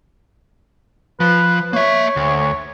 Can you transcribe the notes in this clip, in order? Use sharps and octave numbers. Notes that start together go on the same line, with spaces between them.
F3 B4
A#3 C#5 E5
D2